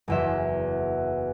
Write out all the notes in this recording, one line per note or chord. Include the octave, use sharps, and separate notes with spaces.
F#1 E2 E5